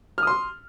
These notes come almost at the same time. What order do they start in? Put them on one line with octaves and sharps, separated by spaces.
F6 D#6 C6